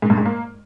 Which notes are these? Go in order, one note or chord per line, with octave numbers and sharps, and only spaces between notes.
G#2
G2
G#2
A#3